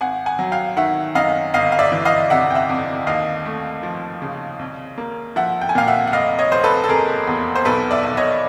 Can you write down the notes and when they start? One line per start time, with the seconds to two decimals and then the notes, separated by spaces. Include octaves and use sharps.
0.01 G#1 F#5 G#5
0.26 F#5 G#5
0.39 F#3
0.52 F5 G5
0.77 D#3 E5 F#5
1.15 F#2 D#5 F5
1.54 G1 D#5 F5
1.72 F5
1.79 D5 E5
1.92 E3
2.05 D#5 F5
2.30 C3 E5 F#5
2.51 G5
2.55 E5 F#5
2.69 F2
3.07 D#2 D#5 F5
3.45 A3
3.83 F3
4.22 C#3
4.59 C2
4.98 A#3
5.36 F3 E5 F#5
5.61 G5
5.69 G#5
5.75 A#2 F5 G5
5.88 E5 F#5
6.07 F#5
6.12 F1 D#5 F5
6.39 C#5 D#5
6.51 F1 C5
6.64 A4 B4
6.84 A4
6.89 C3 G#4 A#4
7.27 E2
7.55 C5
7.65 B1 A4 B4
7.91 D5 E5
8.03 B1
8.17 C#5 D#5